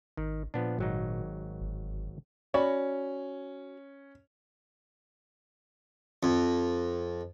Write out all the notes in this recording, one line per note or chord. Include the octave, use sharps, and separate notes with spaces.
G#1 D#3
A#2 F3 B3 D4
G#1 F#3 D#4
G1
C#4 F#4 D5 B5
F2